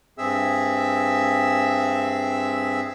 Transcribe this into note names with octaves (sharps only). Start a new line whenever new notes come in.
G2 C4 G#4 E5 E6